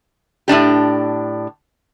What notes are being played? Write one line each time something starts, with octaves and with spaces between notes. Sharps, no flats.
A2 D#3 D4 G4